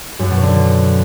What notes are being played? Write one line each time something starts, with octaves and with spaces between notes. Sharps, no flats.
F#2
B2
D3